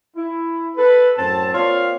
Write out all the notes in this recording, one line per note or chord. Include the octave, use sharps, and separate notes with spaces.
E4
A4 B4
F#2 A2 C4 A5
A#3 C4 F4 C#5 D5 F5